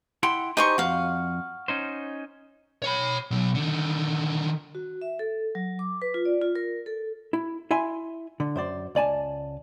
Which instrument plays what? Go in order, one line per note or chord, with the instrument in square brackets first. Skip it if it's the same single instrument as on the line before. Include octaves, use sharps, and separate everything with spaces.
[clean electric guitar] E4 F#5 G5 [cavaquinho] C6
[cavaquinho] D#4 C5 C#6 [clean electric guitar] G4 G#5
[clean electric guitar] F2 [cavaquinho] F#4 F5
[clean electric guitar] C#4 D#4 C5
[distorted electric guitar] C#5 B5
B2 F#3
D3 D#3
[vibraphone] F#4
E5
A4
F#3
D6
B4
F4
D5
F4
A#4
A4
[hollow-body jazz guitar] E4
E4 E5 G#5 C6
D3
F#2 C5 D5
C#2 D5 G#5 A5